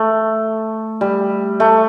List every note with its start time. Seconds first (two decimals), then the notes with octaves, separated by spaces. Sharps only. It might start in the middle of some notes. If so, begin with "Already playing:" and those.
Already playing: A3
1.01 G3
1.60 A3